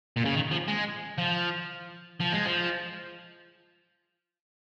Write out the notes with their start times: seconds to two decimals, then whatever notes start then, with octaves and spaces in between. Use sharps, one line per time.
0.17 A#2
0.25 C#3
0.35 D#3
0.51 F3
0.68 G#3
1.19 F3
2.20 F3
2.32 G#3
2.45 F3